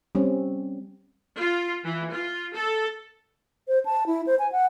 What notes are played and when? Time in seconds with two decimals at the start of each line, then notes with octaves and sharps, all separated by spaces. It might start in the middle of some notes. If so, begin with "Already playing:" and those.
0.15 G3 C4 C#4
1.39 F4
1.84 E3
2.13 F4
2.54 A4
3.68 C5
3.85 A5
4.07 E4
4.27 C5
4.39 G#5
4.52 F#5